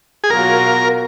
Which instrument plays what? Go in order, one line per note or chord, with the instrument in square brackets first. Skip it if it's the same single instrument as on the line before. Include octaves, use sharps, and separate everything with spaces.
[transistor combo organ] G#4
[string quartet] B2 F#3 A#3 F4 [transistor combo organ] A#4